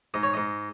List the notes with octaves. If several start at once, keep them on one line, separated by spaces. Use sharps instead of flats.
G#2 D#5
C#5
G#2 D#5